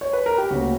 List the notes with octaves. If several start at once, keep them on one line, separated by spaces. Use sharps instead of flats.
C#5
B4
A#4
G4
D2 C#3 F#3 A#3 F#4